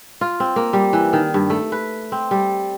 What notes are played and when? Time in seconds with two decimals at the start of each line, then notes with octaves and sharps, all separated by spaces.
0.21 F4
0.40 C4
0.56 A#3
0.73 G3
0.93 E3
1.13 D#3
1.34 G2
1.50 A3
1.72 B4
2.12 C4
2.31 G3